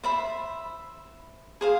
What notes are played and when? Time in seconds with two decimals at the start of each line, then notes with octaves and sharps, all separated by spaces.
0.04 C5 E5 B5
1.61 G#4 C5 F5